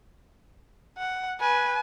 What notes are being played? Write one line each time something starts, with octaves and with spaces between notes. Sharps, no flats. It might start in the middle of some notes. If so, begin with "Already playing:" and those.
F#5
B4 G#5